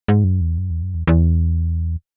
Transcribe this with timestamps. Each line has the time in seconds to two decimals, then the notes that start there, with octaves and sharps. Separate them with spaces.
0.08 G#2
0.24 F#2
0.41 E2
0.58 F#2
0.70 E2
0.83 F#2
0.94 E2
1.07 E2